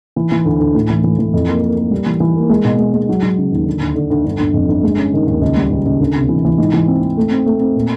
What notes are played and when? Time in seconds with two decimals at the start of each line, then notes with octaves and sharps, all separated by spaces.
0.16 E3
0.32 E3
0.45 D2
0.60 D2
0.75 A2
0.89 E3
1.04 E3
1.19 E3
1.34 F2
1.48 A#3
1.63 A#3
1.76 A#3
1.91 G3
2.06 E3
2.20 E3
2.36 A#3
2.49 G#3
2.64 B2
2.79 G#3
2.94 G#3
3.09 F#3
3.22 F#3
3.38 C#3
3.52 D#2
3.66 D3
3.81 D2
3.95 D3
4.10 D2
4.24 G1
4.40 G1
4.54 F2
4.68 G1
4.83 G#3
4.98 C#4
5.13 D#3
5.27 D#2
5.41 C#2
5.57 G3
5.70 C#2
5.86 C#2
6.00 D2
6.15 C3
6.29 E3
6.45 E3
6.58 G#2
6.74 E3
6.87 C4
7.02 C4
7.17 A3
7.31 C4
7.46 A3
7.60 C4
7.75 A#2